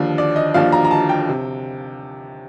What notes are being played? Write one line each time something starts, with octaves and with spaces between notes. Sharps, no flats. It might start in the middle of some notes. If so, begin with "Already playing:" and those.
Already playing: D#2 D3 F3
D5
D#5
D#2 D3 F3 F5
A#5
A#5
A5
G5
C3